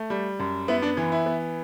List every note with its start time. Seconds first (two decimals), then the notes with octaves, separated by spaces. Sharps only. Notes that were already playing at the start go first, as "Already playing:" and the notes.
Already playing: A3
0.10 G3
0.39 F#2
0.68 B3 E4
0.82 D4
0.97 E3
1.12 E4
1.26 B3